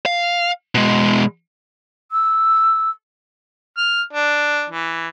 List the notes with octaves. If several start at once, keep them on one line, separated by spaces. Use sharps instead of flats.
F5
B2 G#3
E6
F6
D4
E3